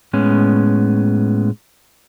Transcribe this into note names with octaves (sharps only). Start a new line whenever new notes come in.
A2 G#3 B3 C#4